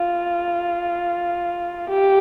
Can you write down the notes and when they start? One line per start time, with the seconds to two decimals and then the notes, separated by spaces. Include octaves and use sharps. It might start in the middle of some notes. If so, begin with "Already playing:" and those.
Already playing: F4
1.89 G4